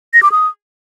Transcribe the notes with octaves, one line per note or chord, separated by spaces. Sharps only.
A#6
D6
D#6